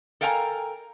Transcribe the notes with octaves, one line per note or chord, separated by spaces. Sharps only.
A4 A#4 F5 G5 G#5 A#5